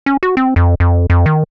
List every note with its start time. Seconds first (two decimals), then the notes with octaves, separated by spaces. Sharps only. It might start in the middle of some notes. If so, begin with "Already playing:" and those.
0.06 C#4
0.23 F#4
0.37 C4
0.56 F2
0.80 F2
1.10 F2
1.26 D#3